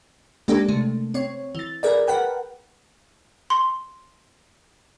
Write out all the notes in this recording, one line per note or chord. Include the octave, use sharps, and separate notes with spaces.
G#3 A#3 D4 G4 A4
C3 A3
C4 C#5
E3 A6
G#4 A#4 B4 D5
A#4 B4 F#5 G5 A5
C6